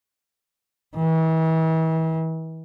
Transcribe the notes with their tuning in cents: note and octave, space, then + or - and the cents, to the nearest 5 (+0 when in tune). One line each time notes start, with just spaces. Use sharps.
E3 -40